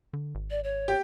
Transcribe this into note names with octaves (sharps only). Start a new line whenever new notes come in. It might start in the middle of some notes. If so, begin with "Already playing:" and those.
D3
G#1
D5
C#5
G4